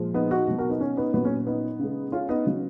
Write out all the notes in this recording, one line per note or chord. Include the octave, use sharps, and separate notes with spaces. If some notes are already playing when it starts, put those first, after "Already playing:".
Already playing: A#2 F3 G#3
B3 D#4
D#4 F#4
B2 F#3
F#4 A#4
B3 D#4
C#4
B3 D#4
A#2 F#3 B3
C#4
B3 D#4
C#3 G#3
C#4 F4
B3 D#4
C#3 F#3